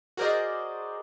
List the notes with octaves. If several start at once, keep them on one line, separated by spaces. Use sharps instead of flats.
F#4 G#4 A#4 C5 D5 D#5